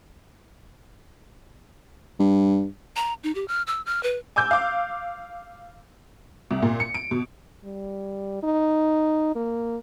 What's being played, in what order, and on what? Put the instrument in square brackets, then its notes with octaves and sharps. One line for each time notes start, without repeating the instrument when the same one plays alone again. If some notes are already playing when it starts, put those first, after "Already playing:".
[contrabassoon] G2
[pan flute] A#5
D#4
G4
F6
E6
F6
B4
[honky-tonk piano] G#5 D6 E6 G6
F5 D6
C2
A#2
C#7
D7
B2
[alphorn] G3
D#4
A#3